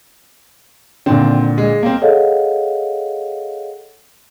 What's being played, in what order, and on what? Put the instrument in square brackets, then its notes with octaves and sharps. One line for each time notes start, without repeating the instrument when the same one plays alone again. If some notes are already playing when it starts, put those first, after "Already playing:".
[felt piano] A#2 D3 [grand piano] D#3 C4
[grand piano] G#3
A#3 C4
[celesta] G#4 A4 C#5 D#5 F5 F#5